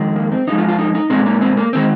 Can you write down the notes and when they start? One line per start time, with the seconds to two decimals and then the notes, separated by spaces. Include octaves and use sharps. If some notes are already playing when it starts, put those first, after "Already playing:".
Already playing: F2 D#3 G#3
0.16 A#3
0.32 C4
0.47 F2 F3 G#3 D#4
0.58 F4
0.68 F4
0.79 D#4
0.95 D#4
1.10 A#2 G#3 C4
1.26 A#3
1.41 C4
1.57 A#3
1.73 D#3 G#3 C4